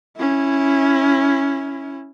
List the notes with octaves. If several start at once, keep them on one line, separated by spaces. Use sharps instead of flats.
C#4 E4